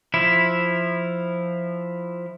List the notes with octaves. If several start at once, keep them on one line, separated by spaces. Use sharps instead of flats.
F3 E4